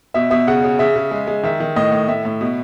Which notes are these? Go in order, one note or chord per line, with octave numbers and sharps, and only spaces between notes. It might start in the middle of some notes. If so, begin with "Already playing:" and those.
B2 E5
B2 E5
C#3 F#5
C#3
C#3 E5
C#3
G#3
G#3
D#3 E5
D#3
A2 D#5
A2
A2 E5
A2
B2